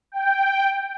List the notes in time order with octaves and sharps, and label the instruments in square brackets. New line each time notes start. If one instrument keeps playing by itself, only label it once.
[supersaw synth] G5